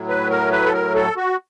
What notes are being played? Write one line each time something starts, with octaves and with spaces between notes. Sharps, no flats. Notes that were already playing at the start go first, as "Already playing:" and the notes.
Already playing: A2 F#3
B4
A#4
B4
A4
A#4
A4
F#4